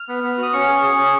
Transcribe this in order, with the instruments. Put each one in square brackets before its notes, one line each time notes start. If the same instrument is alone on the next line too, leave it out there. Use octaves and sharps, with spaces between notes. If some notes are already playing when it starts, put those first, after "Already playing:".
Already playing: [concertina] F6
B3
B3
F#4 D#6
C#4 C#6
G#4
G#4
C#4